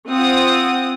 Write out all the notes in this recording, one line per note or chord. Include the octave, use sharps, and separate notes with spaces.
C4 F4 F#5 D#6